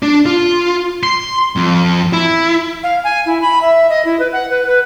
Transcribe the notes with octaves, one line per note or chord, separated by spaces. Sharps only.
D4
F4
C6
F2
E4
F5
G#5
E4
B5
E5
D#5
E4
B4
F#5
B4
B4